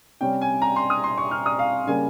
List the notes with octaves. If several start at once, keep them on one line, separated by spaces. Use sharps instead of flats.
C3 G3 C#4 G5
G#5
A#5
C6
D#6
C6
C#6
F6
D#6
F5
C#3 G3 A#3 G#5